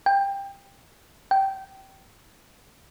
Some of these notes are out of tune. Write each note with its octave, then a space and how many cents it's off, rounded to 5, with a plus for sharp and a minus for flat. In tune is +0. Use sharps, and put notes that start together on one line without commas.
G5 +15
G5 -20